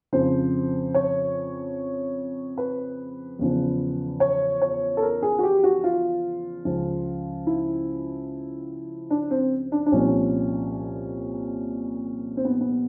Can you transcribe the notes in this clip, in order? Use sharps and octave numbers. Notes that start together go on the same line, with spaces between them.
F2 C#3 F3 C5
C#5
B4
E2 C#3 F3
C#5
C#5
A4
A#4
G#4
F#4
G4
F#4
F4
C#2 C#3 F3
E4
D4
C4
D4
D4
C2 A#2 F3 C#4
C4
B3
B3